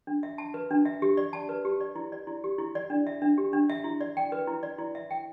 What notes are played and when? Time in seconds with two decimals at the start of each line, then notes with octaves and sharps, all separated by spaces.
0.07 D4
0.23 E5
0.38 A5
0.54 B4
0.71 D4
0.85 E5
1.02 G4
1.17 D5
1.33 A5
1.49 B4
1.65 G4
1.81 D5
1.96 E4
2.12 D5
2.27 E4
2.44 G4
2.59 E4
2.75 D5
2.90 D4
3.07 E5
3.22 D4
3.38 G4
3.53 D4
3.70 E5
3.84 E4
4.01 D5
4.17 G5
4.32 B4
4.47 E4
4.63 D5
4.79 E4
4.95 E5
5.11 G5